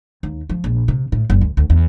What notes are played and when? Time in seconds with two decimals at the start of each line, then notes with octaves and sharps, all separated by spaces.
0.23 D#2
0.49 F3
0.64 A#1
0.88 C3
1.12 A2
1.30 F#1
1.41 D2
1.57 D2
1.70 E2